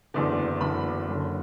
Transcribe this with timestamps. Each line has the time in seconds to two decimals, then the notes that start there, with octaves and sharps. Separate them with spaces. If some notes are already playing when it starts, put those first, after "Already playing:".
0.14 F#1 E2 D3 D5
0.61 F#1 E2 D3 B5
1.08 F#1 F#2 D3